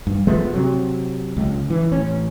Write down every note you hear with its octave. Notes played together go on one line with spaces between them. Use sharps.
G2
F3 G#3 A3 B3
C3 F#3
C#2
E3
A1 C#4